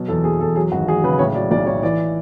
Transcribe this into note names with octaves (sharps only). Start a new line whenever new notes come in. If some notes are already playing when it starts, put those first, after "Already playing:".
Already playing: B2 F#3
E2 A4
B2 G#4
E2 A4
F#3 G#4
G#1 F#4
F#3 G#4
C#3 B4
A2 C#5
F#3 D5
B1 D5
A2 C#5
E3 D5